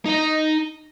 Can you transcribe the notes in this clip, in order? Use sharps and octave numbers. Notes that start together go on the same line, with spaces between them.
D#4 D#5